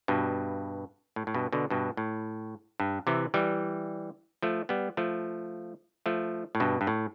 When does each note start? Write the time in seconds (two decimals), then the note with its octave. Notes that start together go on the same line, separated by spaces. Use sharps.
0.08 G2 B2
1.16 A2
1.27 A2
1.34 G2 B2
1.53 B2 D3
1.70 G2 B2
1.97 A2
2.80 G2
3.07 C3 E3
3.34 E3 G3
4.42 F3 A3
4.69 G3 B3
4.97 F3 A3
6.06 F3 A3
6.55 A2
6.60 G2 B2
6.81 G2
6.87 A2